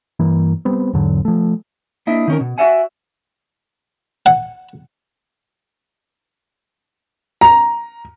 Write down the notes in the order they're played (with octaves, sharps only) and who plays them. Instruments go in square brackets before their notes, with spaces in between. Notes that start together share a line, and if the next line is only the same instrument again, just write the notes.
[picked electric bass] G2 E3 A#3
G3 B3 C4
E2 G#2 D3 F#3
F3 A3
[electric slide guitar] A#3 D4 E4 D#5
D#3 C#4 A#4
B2
F#4 G4 D5 E5 F#5 G#5
[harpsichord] F#5
[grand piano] A#5